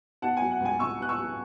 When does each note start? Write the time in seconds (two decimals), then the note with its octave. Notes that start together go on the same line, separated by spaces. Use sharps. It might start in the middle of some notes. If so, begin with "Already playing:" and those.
0.22 B2 F#5 A5
0.37 F#3 G#5
0.51 F#5
0.60 C#2 G#5
0.79 C#2 C#6 E6
0.99 B2 F#6
1.09 C#6 E6
1.18 F#3